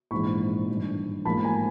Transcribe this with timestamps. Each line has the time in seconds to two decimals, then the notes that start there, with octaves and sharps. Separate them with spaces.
0.11 A#1 G#2 E3 B5 C#6
0.68 A1 G2 D#3
1.25 A1 G#2 F3 A#3 A5 B5
1.44 G#5 A#5